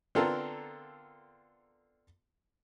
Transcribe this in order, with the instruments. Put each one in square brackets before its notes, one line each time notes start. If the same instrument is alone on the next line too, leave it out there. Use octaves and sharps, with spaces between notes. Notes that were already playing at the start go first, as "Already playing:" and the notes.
[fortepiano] D3 B3 C4 F4 A4 A#4